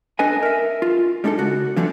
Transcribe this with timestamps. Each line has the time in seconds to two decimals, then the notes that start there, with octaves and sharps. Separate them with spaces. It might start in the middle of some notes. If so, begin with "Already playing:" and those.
0.19 D4 A4 B4 D#5 G#5
0.43 A#4 E5
0.82 F4
1.24 G3 G#3 D4 D#4 A4
1.38 C#3 F#4
1.76 D3 E3 F3 A3 B3 D4